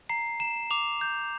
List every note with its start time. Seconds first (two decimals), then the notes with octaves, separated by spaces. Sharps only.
0.09 A#5 C7
0.40 A#5 E7
0.71 D6 F7
1.01 G6